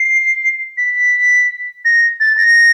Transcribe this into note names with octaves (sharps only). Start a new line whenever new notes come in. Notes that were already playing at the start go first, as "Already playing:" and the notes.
Already playing: C7
B6
A#6
A6
A#6